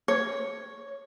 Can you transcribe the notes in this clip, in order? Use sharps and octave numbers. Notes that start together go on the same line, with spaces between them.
C#5